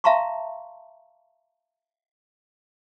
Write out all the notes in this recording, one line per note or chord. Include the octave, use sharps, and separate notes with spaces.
E5 F5 A5 A#5 C6 C#6